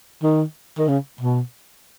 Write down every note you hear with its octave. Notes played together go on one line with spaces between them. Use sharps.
D#3
D#3
C#3
B2